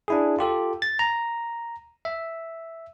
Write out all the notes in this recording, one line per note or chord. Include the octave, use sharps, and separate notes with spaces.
D4 E4 G#4
F4 G4 A4
A6
A#5
E5